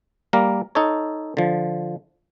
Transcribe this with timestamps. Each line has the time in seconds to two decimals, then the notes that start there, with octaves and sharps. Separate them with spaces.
0.33 G3 A#3 A#4
0.75 D#4 A4 C#5
1.37 D3 F3